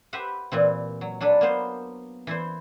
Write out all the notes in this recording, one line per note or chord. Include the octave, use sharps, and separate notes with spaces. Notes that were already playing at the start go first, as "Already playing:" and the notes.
G4 B4 C5 E5 F#5
A#2 E3 C4
F#3
F#3 D4 A4 B4
A#3 B3 C5
E3 E4 C5